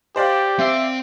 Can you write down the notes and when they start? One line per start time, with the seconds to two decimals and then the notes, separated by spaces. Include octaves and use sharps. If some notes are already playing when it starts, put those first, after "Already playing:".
0.16 G4 C5 D5 F5
0.59 C4 E5 G5